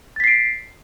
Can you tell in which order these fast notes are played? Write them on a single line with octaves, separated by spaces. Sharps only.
A6 B6 C7 D7